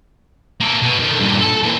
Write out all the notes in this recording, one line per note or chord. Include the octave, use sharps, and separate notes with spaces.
A#3 A4
B2
D3 D#3
G2 A#2
A4 A5
E3 A#3